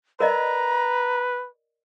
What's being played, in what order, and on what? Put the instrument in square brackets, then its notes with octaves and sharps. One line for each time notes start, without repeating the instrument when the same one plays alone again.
[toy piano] A#4 D5 D#5 [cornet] B4 [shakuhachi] A#5